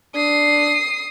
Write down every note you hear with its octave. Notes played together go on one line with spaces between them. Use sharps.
D4 D#6 C7